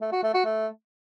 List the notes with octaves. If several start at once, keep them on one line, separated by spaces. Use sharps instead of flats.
A3
F#4
A3
F#4
A3